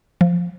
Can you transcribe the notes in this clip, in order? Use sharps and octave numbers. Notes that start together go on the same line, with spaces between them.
F3